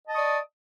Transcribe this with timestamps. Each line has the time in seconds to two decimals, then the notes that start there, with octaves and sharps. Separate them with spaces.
0.06 D#5
0.09 A5
0.12 D#6
0.15 C#6
0.17 D5